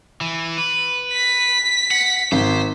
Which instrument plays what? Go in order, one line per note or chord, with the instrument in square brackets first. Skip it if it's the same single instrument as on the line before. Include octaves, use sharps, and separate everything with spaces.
[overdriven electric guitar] E3
B4
[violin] B6
[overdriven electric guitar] F#5
[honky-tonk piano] G#1 [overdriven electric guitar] C5